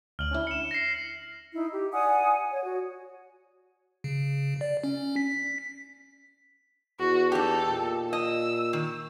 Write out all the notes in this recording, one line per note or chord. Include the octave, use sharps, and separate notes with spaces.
D2 F6 F#7
C#4 D4 E4
C#7 E7
A#6 C7
D#4 E4
G4
D5 F#5 G#5 D#6
C#5
F#4
C#3
D5
C#4
B6
E2 F#4
D#4 G4 A4
A#2
D#5 E6
D#3